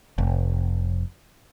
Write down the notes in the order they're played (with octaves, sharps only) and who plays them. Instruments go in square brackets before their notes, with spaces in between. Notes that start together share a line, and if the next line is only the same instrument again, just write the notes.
[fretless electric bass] F1